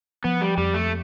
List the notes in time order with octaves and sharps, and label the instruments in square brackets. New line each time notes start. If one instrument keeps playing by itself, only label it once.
[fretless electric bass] F3 [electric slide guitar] B3
[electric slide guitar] G3
[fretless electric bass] F2 [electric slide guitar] G3
[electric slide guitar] A3